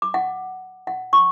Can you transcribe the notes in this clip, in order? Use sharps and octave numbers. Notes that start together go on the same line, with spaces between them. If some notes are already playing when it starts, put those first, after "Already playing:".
D6
F#5
F#5
C#6